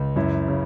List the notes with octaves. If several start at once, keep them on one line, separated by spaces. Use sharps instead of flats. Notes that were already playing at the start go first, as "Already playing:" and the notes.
Already playing: C#2
F#2 E4
C#3